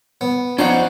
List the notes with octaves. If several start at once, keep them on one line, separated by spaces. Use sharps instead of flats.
B3
F3 C#4 D#4 C5 D5 F#5